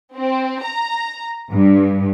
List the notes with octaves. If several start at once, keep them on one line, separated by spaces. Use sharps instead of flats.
C4
A#5
G2